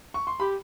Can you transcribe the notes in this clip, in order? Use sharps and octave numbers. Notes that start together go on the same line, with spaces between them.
C#6
C6
G4 B5